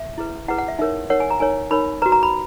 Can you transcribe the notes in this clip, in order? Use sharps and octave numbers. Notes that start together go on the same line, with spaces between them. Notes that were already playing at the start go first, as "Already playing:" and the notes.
Already playing: E5
E4 G#4 B4
E4 G#4 B4 F#5
F#5
E5
D#4 A#4 C#5 E5
D#4 A#4 C#5 F#5
G#5
A#5
D#4 A#4 C#5 G#5
D#4 A#4 C#5 B5
F#4 B4 A#5
A#5
B5